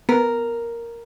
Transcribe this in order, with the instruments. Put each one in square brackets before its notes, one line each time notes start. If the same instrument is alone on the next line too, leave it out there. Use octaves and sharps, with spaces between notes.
[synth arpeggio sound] B3 [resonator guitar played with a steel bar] A#4